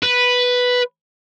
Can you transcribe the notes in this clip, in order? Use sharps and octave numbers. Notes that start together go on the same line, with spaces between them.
B4